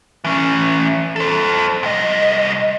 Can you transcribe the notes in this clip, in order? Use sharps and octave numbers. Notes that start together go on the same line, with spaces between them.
E3 C#4
A4 C5
C2 D#5